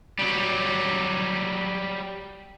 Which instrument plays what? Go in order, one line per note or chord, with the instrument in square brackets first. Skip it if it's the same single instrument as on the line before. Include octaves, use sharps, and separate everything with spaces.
[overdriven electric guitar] F#3 G3